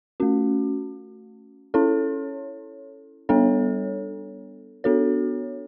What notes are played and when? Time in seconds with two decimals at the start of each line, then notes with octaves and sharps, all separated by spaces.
0.20 A3 C#4 F#4
1.74 C#4 E4 A4 C#5
3.29 G3 B3 D4 A4 C#5
4.84 B3 D4 F#4 A4 C#5